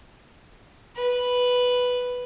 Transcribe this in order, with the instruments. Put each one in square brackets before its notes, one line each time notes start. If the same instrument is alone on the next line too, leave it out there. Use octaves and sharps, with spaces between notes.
[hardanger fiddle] B4